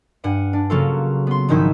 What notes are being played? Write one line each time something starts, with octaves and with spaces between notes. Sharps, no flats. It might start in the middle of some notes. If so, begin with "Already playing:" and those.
G2 F#5 G#5
D4
C#3 F#3 A#3 C#4 F4 A4
B3 C6
A#1 G#2 D#3 D#4 E4 B6